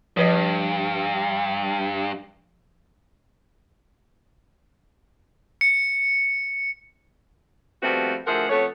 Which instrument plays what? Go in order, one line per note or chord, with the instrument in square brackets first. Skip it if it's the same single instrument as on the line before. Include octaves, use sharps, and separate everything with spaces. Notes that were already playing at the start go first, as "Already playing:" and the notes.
[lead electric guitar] G2 [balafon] F3 B4 D#5
[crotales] C#7
[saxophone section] F3 G3 A3 B3 C4 F#4
D2 F3 G#4 A#4 E5 F#5
F2 A3 B3 C#5